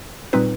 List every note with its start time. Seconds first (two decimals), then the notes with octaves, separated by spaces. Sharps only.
0.33 A#2 G3 C4 D#4 B4